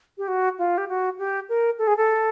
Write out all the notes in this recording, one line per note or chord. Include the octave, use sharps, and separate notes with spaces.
G4
F#4
F4
G4
F#4
G4
A#4
A4
G#4
A4